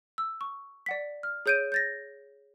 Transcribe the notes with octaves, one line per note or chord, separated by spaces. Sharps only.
E6
C#6
D5 F#5 B6
F6
G#4 C#5 G6 D7 D#7
G6 A6 A#6